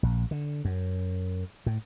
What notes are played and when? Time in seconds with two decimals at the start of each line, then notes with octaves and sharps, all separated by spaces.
0.03 A#1
0.31 D3
0.65 F#2
1.66 A2